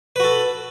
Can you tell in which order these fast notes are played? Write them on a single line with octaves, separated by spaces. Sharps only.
B4 F#4 A4